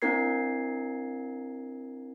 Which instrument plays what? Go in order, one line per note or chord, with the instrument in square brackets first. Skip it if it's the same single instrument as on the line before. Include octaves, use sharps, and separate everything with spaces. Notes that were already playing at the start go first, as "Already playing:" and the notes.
[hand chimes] C4 D4 E4 A#4 G#6 C7